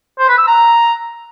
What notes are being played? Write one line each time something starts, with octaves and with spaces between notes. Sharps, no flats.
C5
B4
E6
A#5